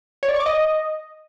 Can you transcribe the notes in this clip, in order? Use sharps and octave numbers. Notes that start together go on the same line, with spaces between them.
C#5
D5
C#6
D6
D#5